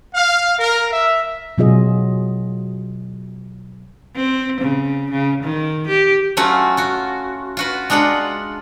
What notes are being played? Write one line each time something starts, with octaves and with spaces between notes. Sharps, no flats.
F5
A#4
E5
B2 F#3 F4 G#4 D#5
C4
C#3
C#3
D#3
G4
F#3 A3 C#4 F4 F#4
F4 F#4
F4 F#4 B4
G#3 D4 F4 F#5 A#5 B5